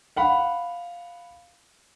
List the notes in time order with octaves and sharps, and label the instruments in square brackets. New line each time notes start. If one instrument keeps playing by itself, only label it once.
[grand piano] F5 F#5 B5